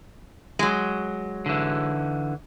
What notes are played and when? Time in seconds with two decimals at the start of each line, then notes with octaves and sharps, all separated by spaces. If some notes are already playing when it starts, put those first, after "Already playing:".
0.59 F#3 G#3
1.46 D3 E3